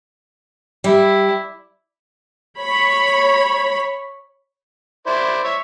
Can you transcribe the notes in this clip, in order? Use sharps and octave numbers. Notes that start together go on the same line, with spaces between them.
G3 E4
C#5 B5
E4 C5 D5
C#5 E5